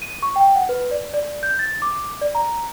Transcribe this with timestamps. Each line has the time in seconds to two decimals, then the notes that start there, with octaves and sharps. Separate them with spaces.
0.02 D#7
0.22 C#6
0.36 G5
0.56 F#5
0.69 B4
0.91 D5
1.14 D5
1.43 G6
1.59 A6
1.82 D6
2.21 D5
2.35 A#5